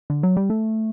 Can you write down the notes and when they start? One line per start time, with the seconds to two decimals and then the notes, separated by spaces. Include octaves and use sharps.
0.10 D3
0.23 F#3
0.37 G3
0.50 A3